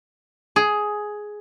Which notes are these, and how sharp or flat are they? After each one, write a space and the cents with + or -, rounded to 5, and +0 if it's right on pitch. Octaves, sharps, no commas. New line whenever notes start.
G#4 +10